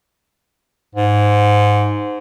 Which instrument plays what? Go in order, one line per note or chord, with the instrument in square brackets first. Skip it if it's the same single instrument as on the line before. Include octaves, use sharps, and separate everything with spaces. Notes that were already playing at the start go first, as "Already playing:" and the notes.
[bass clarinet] G#2